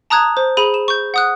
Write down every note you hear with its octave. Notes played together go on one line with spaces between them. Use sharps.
A5 A#5 D#6 F#6 G#6
C5
G#4 B5 D#7 F#7
E7
C#6 G6
F#5 D#6 F#6